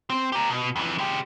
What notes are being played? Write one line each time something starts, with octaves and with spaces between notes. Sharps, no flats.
C4
G4 A#4
B2
F2 E3
G#3 G4